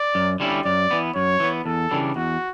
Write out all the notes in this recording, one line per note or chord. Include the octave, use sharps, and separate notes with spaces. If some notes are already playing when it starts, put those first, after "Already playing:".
Already playing: D5
F#2
D3 G3 C#4 E4
F#2 D5
E3 B3
F#2 C#5
E3 B3
E2 A4
C#3 E3 G3 D4
E2 F#4